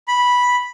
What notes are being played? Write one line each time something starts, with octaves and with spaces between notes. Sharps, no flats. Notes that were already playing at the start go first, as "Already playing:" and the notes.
B5